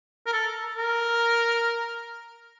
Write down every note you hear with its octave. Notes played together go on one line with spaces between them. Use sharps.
A#4
A4
A#4